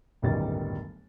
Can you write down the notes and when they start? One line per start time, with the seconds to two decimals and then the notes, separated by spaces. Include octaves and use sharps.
0.22 D1 G1 F#2 D#3 G3 A6